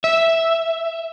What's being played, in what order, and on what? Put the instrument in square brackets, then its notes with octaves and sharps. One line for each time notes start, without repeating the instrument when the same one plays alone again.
[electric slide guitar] E5